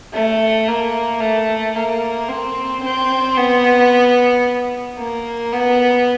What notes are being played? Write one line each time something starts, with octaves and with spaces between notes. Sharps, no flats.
A3
A#3
A3
A#3
C4
C4
B3
A#3
B3